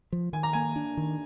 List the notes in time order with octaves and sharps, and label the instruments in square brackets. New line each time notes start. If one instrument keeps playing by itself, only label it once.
[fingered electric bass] F3
[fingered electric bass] D#3 [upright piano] G#5
[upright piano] A#5
[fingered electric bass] A#3 [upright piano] G#5
[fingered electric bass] D4
D#3